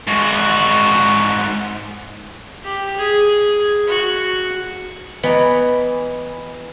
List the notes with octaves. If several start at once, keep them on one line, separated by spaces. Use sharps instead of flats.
G#2 F#4
G4
G#4
F#4
E3 B3 D#5 A#5